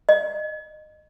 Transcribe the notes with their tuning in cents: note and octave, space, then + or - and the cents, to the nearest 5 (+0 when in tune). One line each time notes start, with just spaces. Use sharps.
D#5 -25